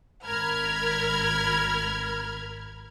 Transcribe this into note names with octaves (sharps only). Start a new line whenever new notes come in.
G#1 A#4 B5 F6 G#6